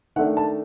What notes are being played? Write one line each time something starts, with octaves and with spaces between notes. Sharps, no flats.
D#3 A3 D4 F#5
A5